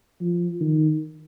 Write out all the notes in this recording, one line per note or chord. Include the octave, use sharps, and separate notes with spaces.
F3
D#3